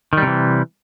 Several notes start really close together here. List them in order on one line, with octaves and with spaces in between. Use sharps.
D#3 G3 C3 E3